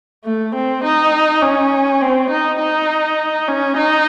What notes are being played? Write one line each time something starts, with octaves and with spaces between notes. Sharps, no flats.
A3
C4
D#4
C#4
C4
D#4
D#4
C#4
D#4